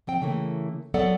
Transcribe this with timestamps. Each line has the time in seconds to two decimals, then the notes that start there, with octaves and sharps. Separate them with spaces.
0.07 F3 C4 G5
0.22 C#3 E3 A3 A#3
0.94 F#3 B3 A4 D5 F#5